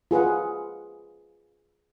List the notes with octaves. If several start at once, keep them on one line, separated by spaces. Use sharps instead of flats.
F4 G#4 B4 F#5